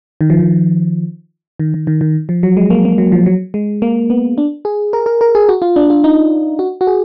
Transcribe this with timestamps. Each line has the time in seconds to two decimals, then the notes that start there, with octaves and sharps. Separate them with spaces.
0.21 D#3
0.30 F3
0.39 D#3
1.60 D#3
1.74 D#3
1.87 D#3
2.01 D#3
2.29 F3
2.43 F#3
2.57 G#3
2.70 A#3
2.85 A#3
2.98 F#3
3.12 F3
3.26 F#3
3.54 G#3
3.82 A#3
4.10 B3
4.38 D4
4.65 G#4
4.93 A#4
5.06 A#4
5.21 A#4
5.35 G#4
5.49 F#4
5.62 F4
5.76 D4
5.90 F4
6.04 D#4
6.59 F#4
6.81 F#4
6.87 G#4